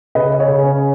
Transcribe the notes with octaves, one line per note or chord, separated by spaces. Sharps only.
C#3 B4 D#5
G#4 C#5
C#3
C#4